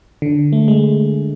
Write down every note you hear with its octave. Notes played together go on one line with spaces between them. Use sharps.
D3
A3
G#3